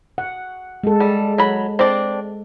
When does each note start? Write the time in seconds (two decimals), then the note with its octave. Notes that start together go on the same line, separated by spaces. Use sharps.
0.18 F#5
0.84 G#3 A4
1.00 G3
1.38 F#3 B5
1.79 C4 D4 D5